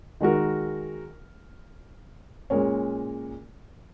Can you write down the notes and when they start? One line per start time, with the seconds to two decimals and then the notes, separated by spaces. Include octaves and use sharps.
0.21 D#3 G#3 F#4 A#4
2.50 A#2 G#3 C#4 A#4 C#5